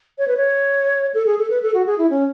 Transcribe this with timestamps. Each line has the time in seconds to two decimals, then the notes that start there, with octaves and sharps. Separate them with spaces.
0.18 C#5
0.28 B4
0.37 C#5
1.14 A4
1.26 G#4
1.38 A4
1.50 B4
1.62 A4
1.74 F#4
1.86 G#4
1.98 E4
2.10 C#4